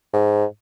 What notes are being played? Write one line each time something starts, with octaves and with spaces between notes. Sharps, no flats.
G#2